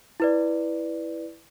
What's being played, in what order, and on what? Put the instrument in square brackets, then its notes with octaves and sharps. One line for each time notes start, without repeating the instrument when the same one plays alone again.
[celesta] E4 B4 D5